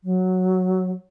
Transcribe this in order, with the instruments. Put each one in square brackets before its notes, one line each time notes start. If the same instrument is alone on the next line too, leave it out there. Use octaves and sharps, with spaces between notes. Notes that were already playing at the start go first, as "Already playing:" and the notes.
[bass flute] F#3